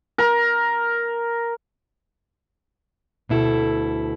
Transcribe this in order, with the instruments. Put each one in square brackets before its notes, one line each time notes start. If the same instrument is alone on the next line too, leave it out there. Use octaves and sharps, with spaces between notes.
[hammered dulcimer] A#4
[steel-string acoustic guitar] D2 B2 E4 A4